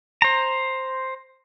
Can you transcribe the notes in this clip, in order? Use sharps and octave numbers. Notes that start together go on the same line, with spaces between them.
C5 A#5